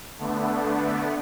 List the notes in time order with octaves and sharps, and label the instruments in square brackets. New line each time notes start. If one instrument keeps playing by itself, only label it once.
[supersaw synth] D3 A3 B3 D4